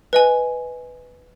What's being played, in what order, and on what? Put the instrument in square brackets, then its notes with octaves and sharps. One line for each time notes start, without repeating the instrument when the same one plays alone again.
[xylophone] B4 D#5 G#5